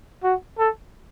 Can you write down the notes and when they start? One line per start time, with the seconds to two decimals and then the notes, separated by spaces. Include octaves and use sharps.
0.24 F#4
0.58 A4